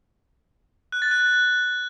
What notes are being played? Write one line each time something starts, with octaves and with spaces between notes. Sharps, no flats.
F#6
A6
F#6